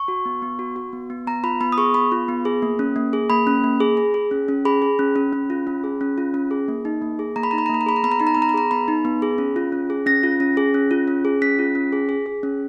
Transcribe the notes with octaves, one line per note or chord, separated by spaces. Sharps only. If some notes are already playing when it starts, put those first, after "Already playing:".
Already playing: C#6
F#4
B3
B3
F#4
F#4
B3
B3
B3 A#5
F4 B5
B3 B5
D#6
G#4 C#6
B3 B5
F4
B3
G#4
A#3
C#4
A#3
G#4
A#3 B5
C#4
A#3
G#4
G#4
G#4
C#4
C#4
G#4 B5
G#4
C#4
C#4
C#4
F4
C#4
G#4
C#4
F4
C#4
G#4
A#3
D#4
A#3
G#4
A#3 A#5
B5
D#4 A#5
B5
A#5
A#3 B5
A#5
G#4 B5
A#5
B3 B5
A#5
D#4 B5
A#5
B3 B5
A#5
B5
G#4 A#5
B3 B5
D#4
B3
G#4
C#4
F4
C#4
G#4
C#4 A#6
F4
C#4
G#4
C#4
F4
C#4
G#4
C#4 B6
F4
C#4
G#4
G#4
G#4
C#4